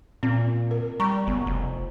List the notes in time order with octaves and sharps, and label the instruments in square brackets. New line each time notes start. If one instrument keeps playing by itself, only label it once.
[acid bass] A#2 [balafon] C4
[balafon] A#4
[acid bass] G3 [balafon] A#5 C#6
[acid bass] F#1 [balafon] B3
[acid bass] F1